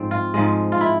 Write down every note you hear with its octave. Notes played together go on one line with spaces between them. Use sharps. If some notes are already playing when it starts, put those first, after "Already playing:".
Already playing: G#2 F3 G#3 C4
F4
G#2 F3 G#3
F4
E4